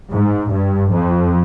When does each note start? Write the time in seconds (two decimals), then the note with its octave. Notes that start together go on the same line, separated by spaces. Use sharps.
0.10 G#2
0.50 G2
0.90 F2